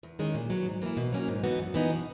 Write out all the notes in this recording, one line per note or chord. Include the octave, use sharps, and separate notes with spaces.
E2
D#3 G#3 C#4
A#2
F#3 B3 F#4
G#2
E3 A#3 E4
B2
F#3 A#3 C#4
G#2
E3 B3 D#4 F#4
F#2
E3 B3 D#4
B2